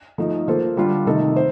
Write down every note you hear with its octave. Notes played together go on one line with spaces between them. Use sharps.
F3 A3 D#4
F3 A#3 F4 A4 C5
D3 G3 D4 F4
C3 D#3 A3 D#4 A4
C5